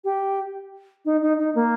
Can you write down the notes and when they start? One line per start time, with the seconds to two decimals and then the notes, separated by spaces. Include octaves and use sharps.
0.04 G4
1.05 D#4
1.22 D#4
1.38 D#4
1.55 A#3